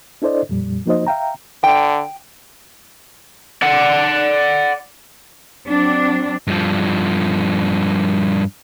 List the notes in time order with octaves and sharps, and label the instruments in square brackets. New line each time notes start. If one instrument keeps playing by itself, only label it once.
[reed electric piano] D4 E4 A4 C5 D5 D#5
F2 A#2 G3
F3 A#3 D#4 F#4 C5 D#5
E5 F5 G5 A#5
[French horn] D3 [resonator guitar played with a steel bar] G5
[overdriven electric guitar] D5 F#5
[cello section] F#3 C4 D4
[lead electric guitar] G2 F3